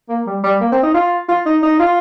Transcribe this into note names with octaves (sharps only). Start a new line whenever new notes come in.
A#3
G3
G3
A#3
C4
D#4
F4
F4
D#4
D#4
F4